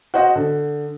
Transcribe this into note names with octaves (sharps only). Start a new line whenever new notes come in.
F#4 C5 D#5 F#5
D3